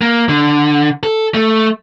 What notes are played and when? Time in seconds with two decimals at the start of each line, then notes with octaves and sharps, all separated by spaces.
0.01 A#3
0.29 D3
1.03 A4
1.34 A3